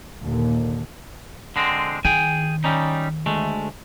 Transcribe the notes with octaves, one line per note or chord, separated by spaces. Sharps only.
D#2 A#2 D3
D3 G#3 C4
D#3 G#4 G5 G#5
G3 C#4 D#4
D2 G#3 A3